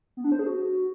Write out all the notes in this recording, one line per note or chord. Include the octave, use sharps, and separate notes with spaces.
B3
D4
C5
G#4
F#4